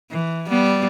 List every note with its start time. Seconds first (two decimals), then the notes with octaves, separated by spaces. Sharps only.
0.11 E3
0.47 G3 B3